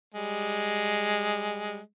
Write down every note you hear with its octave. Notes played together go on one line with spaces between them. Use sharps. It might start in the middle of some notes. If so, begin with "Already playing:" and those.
G3 G#3